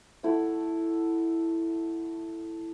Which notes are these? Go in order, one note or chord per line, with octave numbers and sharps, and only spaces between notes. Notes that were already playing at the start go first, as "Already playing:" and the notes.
A3 E4 F#5